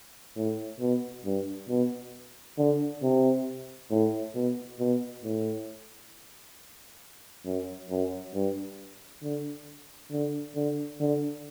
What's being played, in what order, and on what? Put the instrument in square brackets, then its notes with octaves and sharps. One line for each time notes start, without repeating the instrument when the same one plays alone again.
[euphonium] A2
B2
G2
B2
D3
C3
A2
B2
B2
A2
F#2
F#2
G2
D3
D3
D3
D3